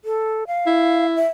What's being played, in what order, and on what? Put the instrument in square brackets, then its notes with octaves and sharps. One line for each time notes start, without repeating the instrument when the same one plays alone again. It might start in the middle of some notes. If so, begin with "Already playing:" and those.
[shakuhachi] A4
F5
[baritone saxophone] E4
[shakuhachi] E5